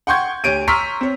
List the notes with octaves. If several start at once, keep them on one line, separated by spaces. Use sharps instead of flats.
F#5 G5 C6 C#6 G6 G#6
D2 G4 C#5 D7 D#7
A#5 C6 C#6 E6 F6 B6
C4 C#5